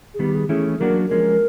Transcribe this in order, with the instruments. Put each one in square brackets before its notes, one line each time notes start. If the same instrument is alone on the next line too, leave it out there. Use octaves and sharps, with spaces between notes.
[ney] G#4
[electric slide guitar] D#3 G3 B3 [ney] G4
[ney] G#4
[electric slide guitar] E3 A3 C#4 E4 [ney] G#4
[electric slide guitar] F#3 A#3 D4 F#4 [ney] A#4
[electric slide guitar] F3 G#3 C#4 [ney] A#4